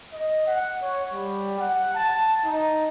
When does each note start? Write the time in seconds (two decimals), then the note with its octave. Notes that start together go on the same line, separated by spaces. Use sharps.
0.13 D#5
0.47 F#5
0.82 C#5
1.13 G3
1.60 F#5
1.95 A5
2.45 D#4